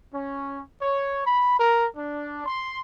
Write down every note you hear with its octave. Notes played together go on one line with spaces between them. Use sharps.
C#4
C#5
B5
A#4
D4
C6